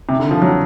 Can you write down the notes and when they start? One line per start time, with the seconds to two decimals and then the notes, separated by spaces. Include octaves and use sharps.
0.09 C3
0.20 D3
0.31 F3
0.42 F#3